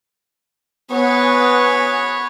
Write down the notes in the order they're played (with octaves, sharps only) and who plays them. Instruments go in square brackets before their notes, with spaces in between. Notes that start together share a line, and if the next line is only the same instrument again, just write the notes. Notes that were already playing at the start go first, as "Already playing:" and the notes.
[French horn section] B3 [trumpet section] F#4 G#4 [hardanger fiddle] B4 C#5